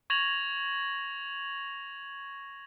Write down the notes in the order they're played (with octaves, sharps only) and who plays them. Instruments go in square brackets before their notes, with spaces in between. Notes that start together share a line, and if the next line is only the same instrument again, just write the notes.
[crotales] C#6 G#6 A#6 F7 F#7